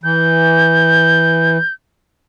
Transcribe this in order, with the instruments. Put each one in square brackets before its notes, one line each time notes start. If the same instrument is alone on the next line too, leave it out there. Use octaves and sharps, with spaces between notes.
[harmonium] E3 [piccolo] G6